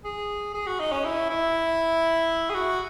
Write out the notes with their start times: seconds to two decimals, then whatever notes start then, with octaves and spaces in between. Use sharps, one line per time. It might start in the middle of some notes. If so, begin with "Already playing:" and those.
0.04 G#4
0.54 G#4
0.67 F#4
0.79 D#4
0.92 C#4
1.04 E4
1.30 E4
2.50 G#4
2.55 F#4